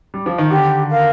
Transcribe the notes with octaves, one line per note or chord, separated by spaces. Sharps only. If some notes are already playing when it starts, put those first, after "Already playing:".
G3
F3
D#3
D3 G4
A#4 F5